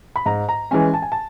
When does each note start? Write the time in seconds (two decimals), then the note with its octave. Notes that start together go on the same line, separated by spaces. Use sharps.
0.16 B5
0.26 G#2 A#5
0.49 A#5
0.71 E3 G#3 C#4 G#5
0.94 A5
1.02 G#5
1.12 A5